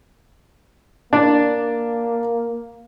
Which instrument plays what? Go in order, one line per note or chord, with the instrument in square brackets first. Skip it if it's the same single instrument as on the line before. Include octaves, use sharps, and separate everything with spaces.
[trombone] A#3 [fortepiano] D4 D5